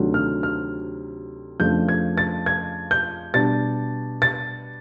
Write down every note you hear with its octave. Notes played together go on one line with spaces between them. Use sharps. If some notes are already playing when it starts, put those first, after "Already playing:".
Already playing: D2 C3 D#3 F#3
F6
F6
F2 C#3 F3 A3 D4 G6
G#6
A6
G#6
G6
B2 G3 B3 D4 A6
A6